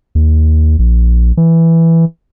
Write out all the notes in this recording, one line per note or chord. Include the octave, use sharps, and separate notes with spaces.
D#2
A#1
E3